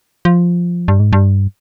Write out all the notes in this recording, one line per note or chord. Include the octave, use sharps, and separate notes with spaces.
F3
G2
G#2
G2